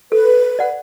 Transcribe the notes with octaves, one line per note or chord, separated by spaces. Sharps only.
A4 B4
D5 F#5